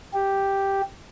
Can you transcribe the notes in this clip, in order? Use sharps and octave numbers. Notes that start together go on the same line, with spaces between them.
G4